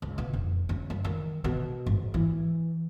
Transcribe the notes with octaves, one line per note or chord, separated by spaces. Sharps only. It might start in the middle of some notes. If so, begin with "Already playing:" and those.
C#2
B2
F1
C#3
F#2
D#3
B2
G#1
E3